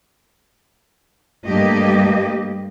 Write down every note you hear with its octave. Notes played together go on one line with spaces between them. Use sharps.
G2 G3 A3 A#3 G4 D#5